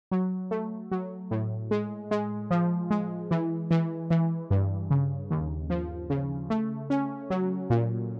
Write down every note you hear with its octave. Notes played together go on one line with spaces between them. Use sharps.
F#3
A3
F#3
A2
G#3
G#3
F3
G#3
E3
E3
E3
G2
C#3
D#2
F3
C#3
A3
C#4
F#3
A#2